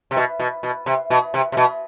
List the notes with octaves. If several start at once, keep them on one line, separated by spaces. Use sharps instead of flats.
C3
B2
B2
B2
C3
B2
C3
C3
B2